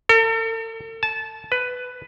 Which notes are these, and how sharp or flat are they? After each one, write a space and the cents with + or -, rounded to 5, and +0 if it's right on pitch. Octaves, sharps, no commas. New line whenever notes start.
A4 +45
A5 -20
B4 +10